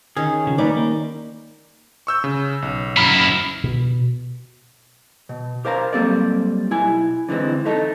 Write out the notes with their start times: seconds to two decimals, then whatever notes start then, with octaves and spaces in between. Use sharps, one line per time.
0.17 D#3 C#4 G#4
0.47 C#3 F3
0.58 G3 A#3 D#4 B4 D5
0.77 A#3
2.07 C#6 E6 G6
2.24 C#3
2.62 B1
2.97 F#2 E4 A#5 B5 F6
3.64 B2
5.29 B2
5.65 G4 A#4 C5 F5 G#5 A#5
5.93 F#3 G3 A#3 C4 A4 D5
6.71 B1 E4 G#5
7.29 D3 E3 G#3 C4
7.65 A3 D#4 A4